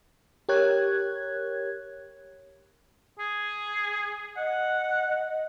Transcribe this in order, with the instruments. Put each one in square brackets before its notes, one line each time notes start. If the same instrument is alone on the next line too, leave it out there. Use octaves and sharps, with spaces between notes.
[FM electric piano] G4 A#4 C#5 F#6 G#6
[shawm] G#4
[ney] D#5 [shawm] F#5